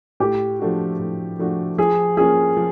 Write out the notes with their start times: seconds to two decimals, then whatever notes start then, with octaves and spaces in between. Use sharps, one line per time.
0.20 A2 G4
0.59 F3 A3 D4 F#4
0.99 A2
1.39 F3 A3 D4 F#4
1.78 F3 G#4
2.17 A#3 C#4 F4 G#4
2.57 F3